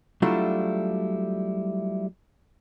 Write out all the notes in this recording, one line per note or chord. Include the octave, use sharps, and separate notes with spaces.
F#3 G3 A3 D4 E4 F4